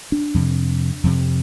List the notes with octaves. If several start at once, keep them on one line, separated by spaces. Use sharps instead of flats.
D4
F2 C3
F2 C3